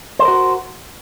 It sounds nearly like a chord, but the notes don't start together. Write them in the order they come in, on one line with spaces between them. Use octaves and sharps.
C5 A4 A#4 F#4